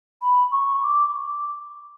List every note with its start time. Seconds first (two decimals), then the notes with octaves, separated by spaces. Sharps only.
0.22 B5
0.52 C#6
0.83 D6